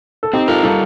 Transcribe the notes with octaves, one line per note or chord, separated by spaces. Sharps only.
A4
C4 D#4 G4
F4 A4 A#4
G3 F4 A4